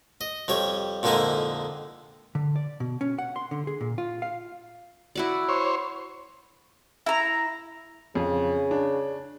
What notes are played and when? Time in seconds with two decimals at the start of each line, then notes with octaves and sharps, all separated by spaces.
0.21 D#5
0.48 F2 G3 C#5
1.03 F2 A#2 D3 G#3 D#4 E4
2.35 D3
2.56 D5
2.80 B2
3.01 C#4
3.19 F#5
3.36 C6
3.51 D3
3.67 G#4
3.81 A#2
3.98 F4
4.22 F5
5.15 E4 F#4 D5
5.49 C5 C#5
7.06 E4 A#5
8.15 F2 C#3
8.71 D4